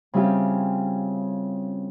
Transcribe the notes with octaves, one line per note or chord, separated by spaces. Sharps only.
C#3 G3 C4 E4 F4 G4